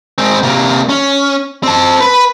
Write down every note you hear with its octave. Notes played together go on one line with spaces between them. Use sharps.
G#3 C4
C3 A#3
C#4
C4 A5
B4